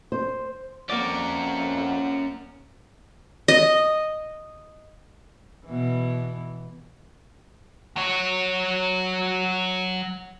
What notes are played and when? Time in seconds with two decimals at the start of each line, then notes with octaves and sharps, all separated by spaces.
0.12 C5
0.90 F2 A#3 C#4 A#4 D5 F#5
3.48 D#5
5.66 B2 E3
7.96 F#3 C#5